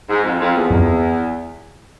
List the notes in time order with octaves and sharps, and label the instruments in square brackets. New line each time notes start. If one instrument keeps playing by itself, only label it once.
[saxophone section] G#2
F2
F2
E2
[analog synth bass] F2